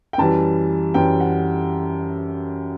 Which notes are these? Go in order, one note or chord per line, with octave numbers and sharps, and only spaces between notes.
G5
F#2 E3 G3 A5
F#2 E3 G3 G5
F#5